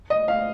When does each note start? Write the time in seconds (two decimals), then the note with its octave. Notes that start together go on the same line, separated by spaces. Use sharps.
0.10 D#5
0.28 F5